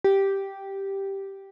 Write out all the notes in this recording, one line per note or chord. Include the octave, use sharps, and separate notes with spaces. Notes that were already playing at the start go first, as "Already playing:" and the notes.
G4